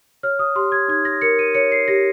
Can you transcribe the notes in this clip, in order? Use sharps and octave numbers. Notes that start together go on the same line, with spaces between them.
C#5 F6
D#6
G4 C6
G#6
D#4 G#6
A#6
A#4 C#7
D#7
C#5 C#7
C7
G4 A#6